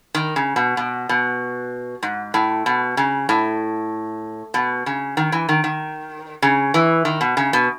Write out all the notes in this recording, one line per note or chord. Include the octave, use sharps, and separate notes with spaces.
D#3
C#3
B2
B2
B2
G#2
A2
B2
C#3
A2
B2
C#3
D#3
E3
D#3
D#3
C#3
E3
D#3
B2
C#3
B2